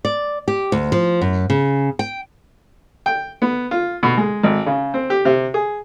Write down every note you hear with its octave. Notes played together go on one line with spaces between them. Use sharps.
D5
G4
D2
F3
F#2
C#3
G5
G5
B3
F4
B2
G#3
G#1
C#3
C4
G4
C3
G#4